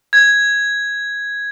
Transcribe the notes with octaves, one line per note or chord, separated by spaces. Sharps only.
G#6